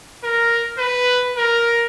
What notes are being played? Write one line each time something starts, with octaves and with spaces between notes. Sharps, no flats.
A#4
B4
A#4